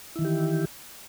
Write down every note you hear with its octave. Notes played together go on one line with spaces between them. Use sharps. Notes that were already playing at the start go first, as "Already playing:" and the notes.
D#3 E3 E4 G4